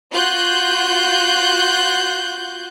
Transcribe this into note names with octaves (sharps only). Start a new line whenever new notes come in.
F4 F#4 F#6 G6